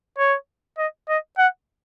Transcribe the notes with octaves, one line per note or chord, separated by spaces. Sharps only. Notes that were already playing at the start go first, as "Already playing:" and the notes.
C#5
D#5
D#5
F#5